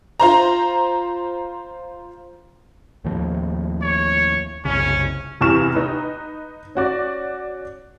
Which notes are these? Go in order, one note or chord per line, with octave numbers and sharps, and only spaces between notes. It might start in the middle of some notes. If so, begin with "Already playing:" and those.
F4 C5 A#5
D#2 A2 F3
C#5
F#1 C2 C#3 C#4
E2 C3 E3 C#6 F6 E7
D#4 B4
C#4 F#4 D5